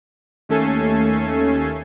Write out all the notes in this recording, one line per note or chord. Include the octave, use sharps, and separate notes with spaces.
D#2 A3 C#4 A4 G#5 C7